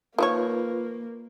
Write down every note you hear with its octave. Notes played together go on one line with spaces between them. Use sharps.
D#3 F3 A#3 F4 B4 C#5